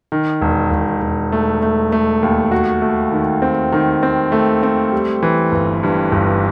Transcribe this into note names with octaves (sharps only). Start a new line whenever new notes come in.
D#3
E1
E1
E1
A3
A3
A3
D#2
F#4
A3
D#3
C4
D#3
C4
A3
C4
G3
E3
G1
G2
G1